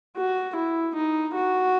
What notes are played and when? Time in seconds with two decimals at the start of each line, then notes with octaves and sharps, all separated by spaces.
0.16 F#4
0.56 E4
0.95 D#4
1.34 F#4